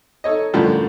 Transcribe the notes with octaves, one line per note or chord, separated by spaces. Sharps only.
D#4 A4 C#5 D#5
F#2 A2 D3 F3 G3